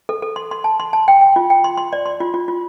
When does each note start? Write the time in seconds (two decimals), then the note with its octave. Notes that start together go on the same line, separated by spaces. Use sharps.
0.09 A4
0.22 A4
0.36 C6
0.51 C6
0.64 A5
0.80 C6
0.93 A5
1.08 G5
1.21 G5
1.36 F4
1.50 G5
1.64 C6
1.77 C6
1.93 D5
2.06 C6
2.20 F4
2.34 F4
2.48 F4